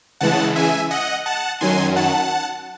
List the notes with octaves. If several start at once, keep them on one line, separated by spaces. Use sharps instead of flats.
C#3 E3 G#3 F#5 A5
E5 G#5
D#5 F#5
F#5 A5
F#2 D#3 F#3 G#5 C6
F#5 A5